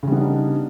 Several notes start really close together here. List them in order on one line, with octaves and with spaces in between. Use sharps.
C#3 G3 B3 D#4 D4